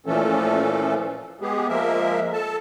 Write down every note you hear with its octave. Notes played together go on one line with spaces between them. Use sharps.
A#2 E3 F3 A3 C#4 A4
G#3 B3 G4 G#4
F3 G#3 A#3 A#4 E5
A4 A5